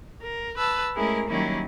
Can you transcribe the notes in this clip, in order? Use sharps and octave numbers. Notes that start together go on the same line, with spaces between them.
A#4
B4 A5 E6
G#3 A3 C#4 E4 G#4 A#4
D#3 F#3 G3 A#3 C#4 E4